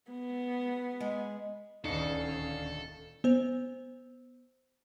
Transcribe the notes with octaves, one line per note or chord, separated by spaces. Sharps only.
B3
G#3
D#1 D2 C#4 D#4 A4 F5 C#7
B3 C5